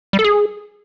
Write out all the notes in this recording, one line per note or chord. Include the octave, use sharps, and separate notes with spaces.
G3
A4
G#4